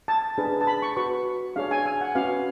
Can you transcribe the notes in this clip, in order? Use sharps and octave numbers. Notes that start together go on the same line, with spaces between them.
A5
D4 G#4 B4
A5
B5
C#6
F#4 B4 C#6
D4 G#4 C#5 F5
G#5
G#5
F#5
C#4 F#4 B4 F5